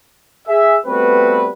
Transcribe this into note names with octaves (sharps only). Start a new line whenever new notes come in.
G#4 E5
G3 A3 B3 C4 F#4 B4